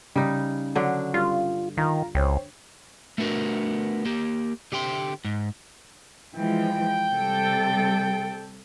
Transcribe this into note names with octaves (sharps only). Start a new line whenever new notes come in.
C#3 G3 D#4
D3 F#3 D4
G2 F4
D#3 F4 A#5
C#2 C5 C#5 G5
A3 B3 D4 F#4 A#4
A#3 G4
D3 G4 G5 C6
G#2
E3 F3 G#3 G5
C3 G3 A4